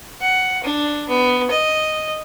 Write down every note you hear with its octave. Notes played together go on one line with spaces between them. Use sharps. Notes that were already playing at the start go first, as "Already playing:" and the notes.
F#5
D4
B3
D#5